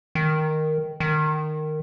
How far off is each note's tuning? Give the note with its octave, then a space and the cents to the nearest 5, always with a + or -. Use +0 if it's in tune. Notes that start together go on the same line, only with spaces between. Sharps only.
D#3 +0
D#3 -15